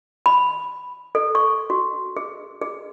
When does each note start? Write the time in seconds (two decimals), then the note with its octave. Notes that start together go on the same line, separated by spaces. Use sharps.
0.26 B5
1.15 A4
1.35 C#6
1.70 F#4
2.17 G#4
2.62 G#4